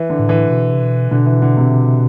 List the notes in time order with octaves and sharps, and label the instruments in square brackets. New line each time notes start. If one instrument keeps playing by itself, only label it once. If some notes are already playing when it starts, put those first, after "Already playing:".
Already playing: [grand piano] E3
D3
[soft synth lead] A2
[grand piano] E3
[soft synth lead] B2
C3
B2
[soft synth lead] B2 [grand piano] D3
[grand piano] E3
D3
C3